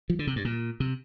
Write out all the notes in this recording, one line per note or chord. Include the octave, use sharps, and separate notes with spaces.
F3
D3
C3
G2
A#2
C3